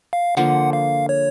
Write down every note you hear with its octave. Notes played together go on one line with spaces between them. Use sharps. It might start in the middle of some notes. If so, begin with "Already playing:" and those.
F5
D3 F3 A#3 F#5
F5
C#5